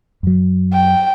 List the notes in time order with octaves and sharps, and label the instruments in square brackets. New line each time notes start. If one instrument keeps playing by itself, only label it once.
[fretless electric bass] F#2 F#3
[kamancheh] G5